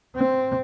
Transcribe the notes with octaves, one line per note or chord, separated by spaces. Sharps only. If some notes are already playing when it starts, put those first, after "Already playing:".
C4